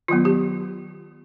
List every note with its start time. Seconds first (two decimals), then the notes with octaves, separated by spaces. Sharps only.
0.08 D#3 F#3 B3 F4
0.25 G4